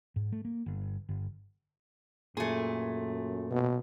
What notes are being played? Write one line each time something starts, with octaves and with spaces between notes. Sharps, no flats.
G#2
A3
A#3
G1
G1
F#2 A#2 A3 G#4
B2